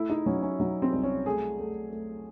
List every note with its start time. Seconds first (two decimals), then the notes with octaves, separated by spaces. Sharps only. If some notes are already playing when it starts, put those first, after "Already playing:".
Already playing: A3 E4
0.10 D#4
0.26 F#3 C#4
0.43 C#4
0.60 F#3 D#4
0.82 C4
0.93 C2
1.04 C#4
1.26 A3 G#4
1.59 A3
1.92 A3